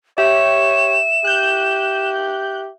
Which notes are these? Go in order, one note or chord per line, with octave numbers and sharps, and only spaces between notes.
G4 C#5 E5 E7
G4 F#6 G6